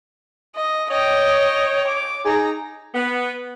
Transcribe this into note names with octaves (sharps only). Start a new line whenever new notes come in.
D#5
C#5 D#5 G5
D6
D#4 G#4 A#5
B3